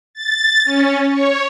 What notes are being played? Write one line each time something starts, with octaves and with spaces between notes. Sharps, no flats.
A6
C#4
C#5